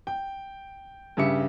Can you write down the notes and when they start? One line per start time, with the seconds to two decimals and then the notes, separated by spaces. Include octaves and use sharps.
0.07 G5
1.17 G2 C#3 G4 E5 C#7